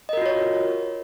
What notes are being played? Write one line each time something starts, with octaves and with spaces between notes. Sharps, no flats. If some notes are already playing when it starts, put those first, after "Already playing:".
F4 F#4 A#4 C#5 D#5